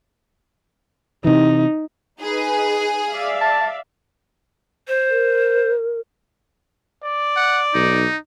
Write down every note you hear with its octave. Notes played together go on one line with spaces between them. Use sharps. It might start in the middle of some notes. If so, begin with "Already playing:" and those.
C3 E3 D#4
D#4 G#4 B4
D5 E5 F5
A5
C5
A#4
D5
F#5
B1 D#4